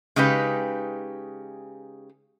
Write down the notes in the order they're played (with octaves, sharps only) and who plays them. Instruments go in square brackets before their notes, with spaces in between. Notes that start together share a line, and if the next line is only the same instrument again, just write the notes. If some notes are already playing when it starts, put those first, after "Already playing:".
[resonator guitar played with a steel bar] C#3 G#3 D#4 G4 B4